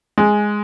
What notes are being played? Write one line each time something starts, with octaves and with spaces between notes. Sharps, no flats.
G#3